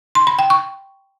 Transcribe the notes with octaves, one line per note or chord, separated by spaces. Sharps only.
C6
B5
G5
C#6